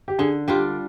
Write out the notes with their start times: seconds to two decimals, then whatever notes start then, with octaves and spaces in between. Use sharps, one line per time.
0.08 G4
0.19 D3 G#4
0.48 G3 D4 F4 G4